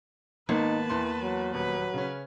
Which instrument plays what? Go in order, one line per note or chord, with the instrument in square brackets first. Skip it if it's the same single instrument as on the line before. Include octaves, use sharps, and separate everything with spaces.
[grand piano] G#1 [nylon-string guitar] A#3 B3 [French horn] D#4 [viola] B4 A5
[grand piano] E2 C6 [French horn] E3
[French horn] F#3
[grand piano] D#1 [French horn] F#3 [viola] B4
[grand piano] C#3 C#4